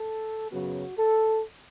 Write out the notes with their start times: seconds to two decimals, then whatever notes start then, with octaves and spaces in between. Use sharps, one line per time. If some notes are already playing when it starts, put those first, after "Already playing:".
Already playing: A4
0.51 F#2 C#3 F#3 B3 F#4
0.97 A4